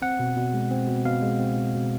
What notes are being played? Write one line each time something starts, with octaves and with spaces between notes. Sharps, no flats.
C4 F#5
B2
B2
G#3
C4
B2
B2 F5
G#3
C4
B2
B2